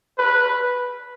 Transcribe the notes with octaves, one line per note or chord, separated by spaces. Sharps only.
B4